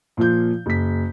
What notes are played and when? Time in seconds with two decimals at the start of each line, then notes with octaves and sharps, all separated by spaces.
0.17 A#2 F3 F4 G6
0.66 F#1 B6